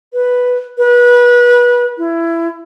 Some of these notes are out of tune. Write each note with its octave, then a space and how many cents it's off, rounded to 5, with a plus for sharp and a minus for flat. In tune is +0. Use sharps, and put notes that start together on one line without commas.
B4 +0
B4 -25
E4 +20